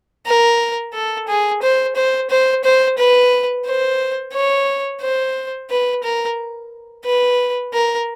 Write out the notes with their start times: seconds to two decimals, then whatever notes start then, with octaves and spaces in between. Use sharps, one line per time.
0.26 A#4
0.94 A4
1.28 G#4
1.63 C5
1.96 C5
2.30 C5
2.64 C5
2.98 B4
3.66 C5
4.34 C#5
5.02 C5
5.70 B4
6.04 A#4
7.05 B4
7.73 A#4